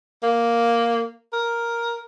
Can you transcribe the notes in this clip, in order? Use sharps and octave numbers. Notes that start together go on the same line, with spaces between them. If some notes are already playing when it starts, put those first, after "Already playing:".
A#3
A#4